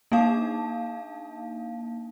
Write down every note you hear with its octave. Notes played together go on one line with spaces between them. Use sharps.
A#3 D4 D#4 F5 A5